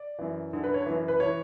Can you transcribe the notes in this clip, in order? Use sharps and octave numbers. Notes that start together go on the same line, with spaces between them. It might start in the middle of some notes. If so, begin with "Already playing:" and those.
Already playing: D5
F#2 E3
F#2 D3
B4
C#5
F#2 E3 B4
B4
E3 C#5